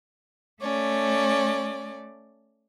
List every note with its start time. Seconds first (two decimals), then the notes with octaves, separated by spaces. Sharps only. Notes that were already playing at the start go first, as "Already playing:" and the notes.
0.61 A3 C#4 D5